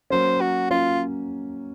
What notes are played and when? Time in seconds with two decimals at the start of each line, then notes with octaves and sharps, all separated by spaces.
0.10 F#3 A#3 C#4 C5
0.41 F#4
0.70 F#3 A#3 C#4 F4